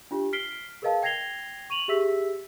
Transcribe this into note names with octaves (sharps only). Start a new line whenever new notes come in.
D4 F4 G4
F6 B6 C7 D7 G7
G#4 A#4 B4 D#5 F5 A5
G5 G#6 A#6 C7 F7 G7
C#6 D#7 F7 F#7
G4 G#4 E5 E6 B6